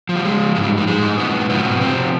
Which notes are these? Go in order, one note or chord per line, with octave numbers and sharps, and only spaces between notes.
F3
G3
G#3
G#2 G#3
G3
G3
G#3
G#2
B2 B3
B2 F3 B3
C3 C4